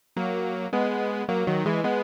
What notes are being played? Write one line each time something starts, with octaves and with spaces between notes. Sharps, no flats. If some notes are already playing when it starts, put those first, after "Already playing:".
F#3 A#3
G#3 B3
F#3 A#3
D#3 F#3
E3 G#3
G#3 B3